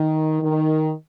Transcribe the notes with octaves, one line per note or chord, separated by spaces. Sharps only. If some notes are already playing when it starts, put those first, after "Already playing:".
Already playing: D#3
D#3